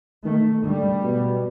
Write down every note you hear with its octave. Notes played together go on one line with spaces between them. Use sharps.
D#3 A3
D3 G3
B2